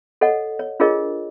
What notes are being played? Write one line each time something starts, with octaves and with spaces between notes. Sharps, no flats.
A4 C#5 D#5 F#5
C#5
D4 F4 G#4 A#4 C#5 D#5